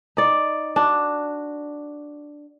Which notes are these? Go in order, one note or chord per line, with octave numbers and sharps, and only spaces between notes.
D#4 D5
D4 F#4